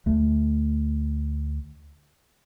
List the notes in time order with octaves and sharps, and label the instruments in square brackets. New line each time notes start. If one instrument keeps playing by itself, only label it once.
[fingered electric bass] D2 A3